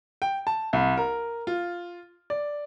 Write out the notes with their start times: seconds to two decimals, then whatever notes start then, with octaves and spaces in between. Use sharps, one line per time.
0.22 G5
0.47 A5
0.73 C2
0.97 A#4
1.47 F4
2.30 D5